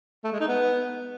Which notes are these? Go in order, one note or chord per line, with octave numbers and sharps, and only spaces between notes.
A3
G#3
D#4
B3